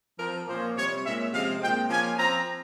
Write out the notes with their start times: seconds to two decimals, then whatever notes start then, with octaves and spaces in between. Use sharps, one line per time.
0.19 F3 C4 A#4
0.47 A#2 F3 A#3 C#4 C5
0.76 C3 G3 C4 C#5
1.05 A#2 G#3 C#4 E5
1.33 C3 F3 G#3 F5
1.61 A#2 G#3 C4 G5
1.89 F3 A#3 C#4 G#5
2.18 F3 C4 A#5